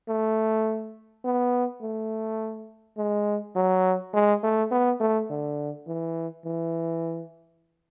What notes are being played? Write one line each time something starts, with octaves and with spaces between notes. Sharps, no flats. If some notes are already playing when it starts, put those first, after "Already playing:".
A3
B3
A3
G#3
F#3
G#3
A3
B3
A3
D3
E3
E3